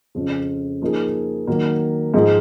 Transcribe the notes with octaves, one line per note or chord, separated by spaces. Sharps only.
F2 C#3 F3
F3 A#3 D#4 G#4
D#3 F#3 A#3
G#2 F3 G#3 D#4